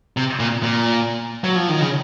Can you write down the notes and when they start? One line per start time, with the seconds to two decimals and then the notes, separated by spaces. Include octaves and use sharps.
0.17 C3
0.40 A#2
0.63 A#2
1.44 F#3
1.56 F3
1.69 D#3
1.81 C#3